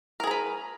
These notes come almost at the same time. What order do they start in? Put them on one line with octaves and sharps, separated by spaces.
A#4 G#4 A#5 B4